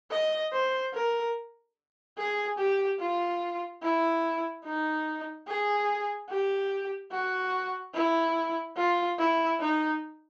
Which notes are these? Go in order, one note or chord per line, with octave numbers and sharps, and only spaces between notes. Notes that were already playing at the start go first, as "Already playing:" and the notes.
D#5
C5
A#4
G#4
G4
F4
E4
D#4
G#4
G4
F#4
E4
F4
E4
D#4